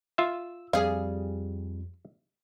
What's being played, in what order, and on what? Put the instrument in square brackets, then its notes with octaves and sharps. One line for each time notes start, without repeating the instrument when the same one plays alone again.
[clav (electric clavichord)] F4 E5 [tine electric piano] E6
[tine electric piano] F2 [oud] G3 G#4 [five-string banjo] F5